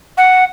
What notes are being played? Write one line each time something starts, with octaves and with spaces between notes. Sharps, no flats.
F#5